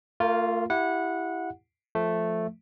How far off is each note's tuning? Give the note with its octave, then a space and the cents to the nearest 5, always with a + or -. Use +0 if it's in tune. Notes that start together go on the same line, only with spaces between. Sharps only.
A3 +45 F4 +0 A#4 +0
E4 +0 G4 -10 F#5 -20
F3 -5 A3 +0